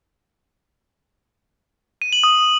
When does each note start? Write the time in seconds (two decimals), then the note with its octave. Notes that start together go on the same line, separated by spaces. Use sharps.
2.02 D#7
2.13 F#7
2.24 D#6